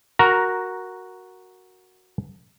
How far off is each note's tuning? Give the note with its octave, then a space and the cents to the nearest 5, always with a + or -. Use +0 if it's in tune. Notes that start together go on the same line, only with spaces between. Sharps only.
F#4 +0 A#4 +0 A#5 +10